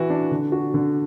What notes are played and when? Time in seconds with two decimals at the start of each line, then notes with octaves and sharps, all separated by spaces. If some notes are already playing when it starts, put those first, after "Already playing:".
Already playing: E3 F#4
0.10 D4
0.31 D3
0.52 F#4
0.74 D3